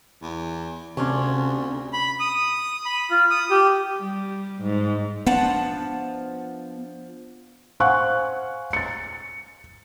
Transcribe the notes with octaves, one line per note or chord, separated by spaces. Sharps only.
E2
D2 C3 C#4 D4 F4
B5
D#6
B5
F4
D#6
G4
G3
G#2
F3 B3 D4 F#5 A5
C5 F5 F#5 G#5 C#6 F#6
A6 C#7